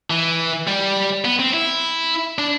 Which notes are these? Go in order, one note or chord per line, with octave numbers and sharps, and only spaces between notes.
E3
G3
B3
C4
E4
D4